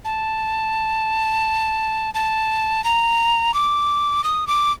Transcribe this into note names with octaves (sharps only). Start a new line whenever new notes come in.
A5
A5
A#5
D6
D#6
D6